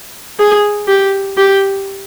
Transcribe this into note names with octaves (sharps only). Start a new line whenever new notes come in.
G#4
G4
G4